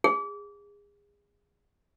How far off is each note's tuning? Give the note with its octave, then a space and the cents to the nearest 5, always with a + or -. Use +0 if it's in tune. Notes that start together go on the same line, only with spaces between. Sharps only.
G#4 -25